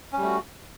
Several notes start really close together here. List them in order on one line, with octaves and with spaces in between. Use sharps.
C#4 G3 A3 F#4